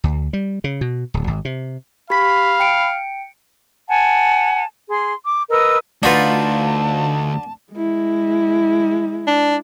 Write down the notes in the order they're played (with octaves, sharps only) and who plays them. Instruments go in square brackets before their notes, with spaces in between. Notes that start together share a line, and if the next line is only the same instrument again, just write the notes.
[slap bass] D2
G3
C#3
B2
D1
G#1
C3
[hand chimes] G4 B6 [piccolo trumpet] F5 [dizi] B5
[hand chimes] G5 C#7 D7
[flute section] F#5 G#5 A5
G#4 C6
D6
A#4 B4 D#5 E6
[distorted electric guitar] D2 A3 [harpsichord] D4 F#4 B4 [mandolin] D#4 F4 [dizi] A5
[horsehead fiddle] G#3 E4
[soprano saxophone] D4